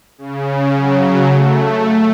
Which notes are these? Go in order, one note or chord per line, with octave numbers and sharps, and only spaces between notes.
C#3
F#3
A3